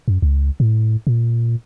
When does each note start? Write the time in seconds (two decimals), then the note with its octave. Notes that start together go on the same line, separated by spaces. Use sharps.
0.08 F#2
0.22 C#2
0.60 A2
1.07 A#2